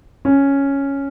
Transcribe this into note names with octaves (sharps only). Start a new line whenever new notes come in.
C#4